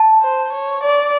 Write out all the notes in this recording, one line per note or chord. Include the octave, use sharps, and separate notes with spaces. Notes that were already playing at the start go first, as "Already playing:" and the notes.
Already playing: A5
C5
C#5
D5